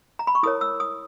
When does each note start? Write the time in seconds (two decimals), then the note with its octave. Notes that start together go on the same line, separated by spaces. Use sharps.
0.19 A#5
0.27 B5
0.35 C#6
0.43 E4 A#4 C#5 D#6
0.61 E6
0.80 D#6